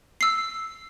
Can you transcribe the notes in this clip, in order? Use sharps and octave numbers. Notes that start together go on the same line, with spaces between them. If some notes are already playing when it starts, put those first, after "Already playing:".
E6 C7